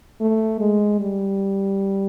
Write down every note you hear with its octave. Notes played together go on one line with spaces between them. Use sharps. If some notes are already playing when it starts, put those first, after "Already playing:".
A3
G#3
G3